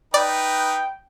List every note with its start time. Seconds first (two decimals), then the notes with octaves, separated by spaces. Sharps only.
0.14 D#4 B4 D5 G5